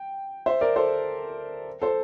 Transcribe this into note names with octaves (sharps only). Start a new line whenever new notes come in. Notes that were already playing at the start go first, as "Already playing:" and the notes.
Already playing: G5
C5 E5
A#4 D5
A4 C5
A4 C5